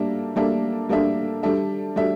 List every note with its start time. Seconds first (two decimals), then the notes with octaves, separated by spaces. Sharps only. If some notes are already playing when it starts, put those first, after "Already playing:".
Already playing: G3 A#3 D4 A4 E5
0.36 G3 A#3 D4 A4 E5
0.89 G3 A#3 D4 A4 E5
1.43 G3 D4 A4 E5
1.96 G3 D4 A4 E5